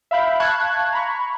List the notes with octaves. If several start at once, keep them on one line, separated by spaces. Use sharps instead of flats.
E5 F5 B5 G6
F5 A5 C#6 F#6 G#6
A#5 B5 C#6